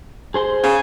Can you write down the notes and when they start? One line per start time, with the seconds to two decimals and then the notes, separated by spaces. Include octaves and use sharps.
0.34 G#4 C5 C6
0.64 C#3 G#5